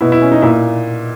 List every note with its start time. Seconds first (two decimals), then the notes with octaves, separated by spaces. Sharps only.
0.01 B2 E4
0.12 E4
0.22 C#4
0.32 D#4
0.42 A#2 E4